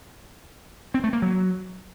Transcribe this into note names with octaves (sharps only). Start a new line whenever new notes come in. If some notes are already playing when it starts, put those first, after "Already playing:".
C4
A3
A#3
F#3